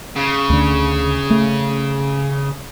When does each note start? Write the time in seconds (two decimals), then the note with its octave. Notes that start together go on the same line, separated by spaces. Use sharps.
0.16 C#3
0.50 D2 D3
1.30 A3